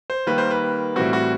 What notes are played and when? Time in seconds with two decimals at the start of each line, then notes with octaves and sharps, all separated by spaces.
0.10 C5
0.27 D#3 G3 A#3 B4
0.38 C5
0.51 B4
0.96 A2 E3 G3 C4 F#4
1.13 F#4